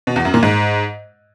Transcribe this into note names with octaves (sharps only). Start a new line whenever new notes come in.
B2
E2
F#2
A#2
G#2